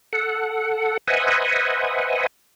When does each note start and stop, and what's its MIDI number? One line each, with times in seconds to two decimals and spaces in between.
0.13 0.97 69
0.13 0.97 78
1.08 2.27 71
1.08 2.27 72
1.08 2.27 75
1.08 2.27 76
1.08 2.27 78
1.08 2.27 80